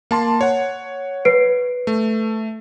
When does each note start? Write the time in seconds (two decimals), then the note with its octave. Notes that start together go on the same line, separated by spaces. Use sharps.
0.11 A#3 A5 C6
0.41 C#5 F#5
1.25 B4 C7 D7
1.87 A3